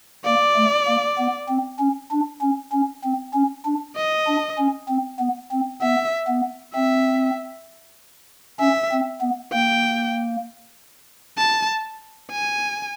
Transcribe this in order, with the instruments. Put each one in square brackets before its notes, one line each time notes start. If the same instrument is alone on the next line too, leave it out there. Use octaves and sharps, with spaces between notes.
[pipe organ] A#3 [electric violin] D5
[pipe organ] A3
A#3
B3
C4
C#4
D4
C#4
C#4
C4
C#4
D4
[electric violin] D#5
[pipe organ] D4
C#4
C4
B3
C4
[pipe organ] B3 [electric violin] E5
[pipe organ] B3
[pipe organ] C4 [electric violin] E5
[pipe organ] C#4 [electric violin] E5
[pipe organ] C4
B3
[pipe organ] A#3 [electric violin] G5
[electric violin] A5
G#5